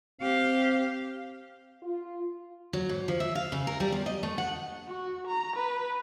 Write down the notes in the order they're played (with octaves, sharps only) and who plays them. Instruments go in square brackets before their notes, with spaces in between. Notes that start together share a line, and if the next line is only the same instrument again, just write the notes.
[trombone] C4 [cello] G4 F5
[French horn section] F4
[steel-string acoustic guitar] F#3
G#2
F3
E5
F5
C#3
A#4
G3
E2
D#5
A3
F#5
[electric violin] F#4
A#5
B4